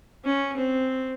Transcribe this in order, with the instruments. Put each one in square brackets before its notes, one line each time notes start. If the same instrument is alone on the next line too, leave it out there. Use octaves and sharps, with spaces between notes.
[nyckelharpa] C#4
C4